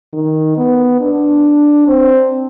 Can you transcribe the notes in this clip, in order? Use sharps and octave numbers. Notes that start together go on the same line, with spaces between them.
D#3
B3
D4
C4